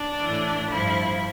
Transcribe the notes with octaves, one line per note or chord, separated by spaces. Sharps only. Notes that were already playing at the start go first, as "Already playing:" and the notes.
Already playing: D4
A2 E3
G2 F3 E4